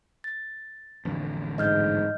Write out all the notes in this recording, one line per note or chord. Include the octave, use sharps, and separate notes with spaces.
A6
A1 F2 D3
G#2 D#5 F6 G6